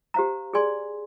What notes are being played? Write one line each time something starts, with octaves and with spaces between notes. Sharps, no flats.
G4 C5 F5 A#5
G#4 D5 G#5 C6